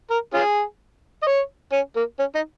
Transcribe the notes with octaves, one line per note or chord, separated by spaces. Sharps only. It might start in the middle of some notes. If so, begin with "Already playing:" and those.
A#4
C#4 F4 G#4
D#5
C#5
C#4
A#3
C#4
D#4